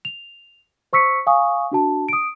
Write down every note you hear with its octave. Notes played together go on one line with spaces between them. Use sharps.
F7
C5 C#6 E6 B6 C#7
F5 G#5 C#6 D#6
D4 F#4 A5
D#6 D7